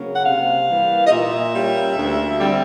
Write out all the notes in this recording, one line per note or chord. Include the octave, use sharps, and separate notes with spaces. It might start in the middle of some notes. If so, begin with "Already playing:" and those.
Already playing: C#3 F#3 A#3 C#4
F#5
C3 F5
E3 G3 A#3
D#5
A#2 E5
G3 A#3 C#4
D2
D3 G3 C4